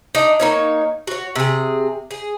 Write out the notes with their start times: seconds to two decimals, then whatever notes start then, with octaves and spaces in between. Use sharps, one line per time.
0.15 D4 D#4
0.40 A#3 D#4 C#5
1.07 F#4 C#5
1.36 C3 G#4
2.11 G#4